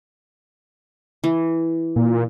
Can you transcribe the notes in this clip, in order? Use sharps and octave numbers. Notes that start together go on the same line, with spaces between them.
E3
A#2